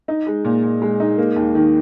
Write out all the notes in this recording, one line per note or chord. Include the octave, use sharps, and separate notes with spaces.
D#4
G#3
A#2
A#2
G#3
D#4
A#3
D#2
D#3